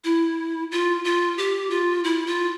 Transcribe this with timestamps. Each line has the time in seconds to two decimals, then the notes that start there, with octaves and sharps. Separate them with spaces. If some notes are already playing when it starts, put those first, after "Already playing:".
0.04 E4
0.72 F4
1.05 F4
1.38 G4
1.70 F4
2.04 E4
2.27 F4